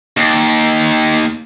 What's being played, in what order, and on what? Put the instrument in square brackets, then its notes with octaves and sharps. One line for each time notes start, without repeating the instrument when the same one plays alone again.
[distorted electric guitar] D#2